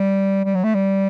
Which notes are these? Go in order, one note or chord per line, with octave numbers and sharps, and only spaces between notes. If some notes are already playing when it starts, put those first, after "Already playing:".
Already playing: G3
G3
F#3
A3
G3